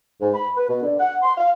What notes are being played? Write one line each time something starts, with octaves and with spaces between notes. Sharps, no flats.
G#2
B5
B4
B2
D3
F#5
C6
F5